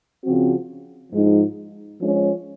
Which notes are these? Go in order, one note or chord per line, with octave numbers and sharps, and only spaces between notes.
C#3 F3 C4 F#4
G#2 F3 G#3 D#4
F3 G#3 C#4